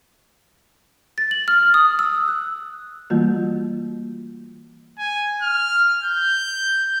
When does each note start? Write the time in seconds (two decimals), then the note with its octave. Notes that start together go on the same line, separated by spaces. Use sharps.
1.18 A6
1.31 F#7
1.48 F6
1.74 D#6
1.99 E6
2.28 F#6
3.10 E3 G3 A3 A#3 F4 F#4
4.98 G#5
5.42 F6
6.04 G6